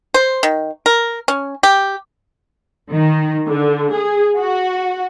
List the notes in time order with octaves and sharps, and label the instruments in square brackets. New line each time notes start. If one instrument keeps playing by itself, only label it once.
[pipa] C5
D#3
A#4
C#4
G4
[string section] D#3
D3
G#4
F#4